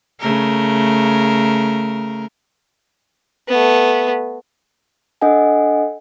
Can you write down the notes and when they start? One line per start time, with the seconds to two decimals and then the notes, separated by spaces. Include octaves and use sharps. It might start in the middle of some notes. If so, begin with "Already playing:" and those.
0.20 C#3 A3 A#4
3.48 A3 B3
5.21 D4 A4 D#5 F#5 G#5